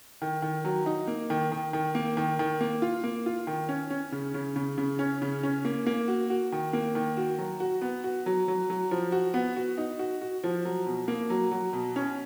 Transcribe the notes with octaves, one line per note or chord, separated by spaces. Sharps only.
D#3
D#3
F#3
D#4
A#3
D#3
D#3
D#3
A#3
D#3
D#3
A#3
F4
A#3
F4
D#3
C#4
C#4
C#3
C#3
C#3
C#3
C#4
C#3
C#4
A#3
A#3
F#4
F#4
D#3
A#3
D#3
F#4
F#3
F#4
B3
F#4
F#3
F#3
F#3
F3
F#4
B3
F#4
D#4
F#4
F#4
F3
F#3
B2
A#3
F#3
F#3
B2
C#4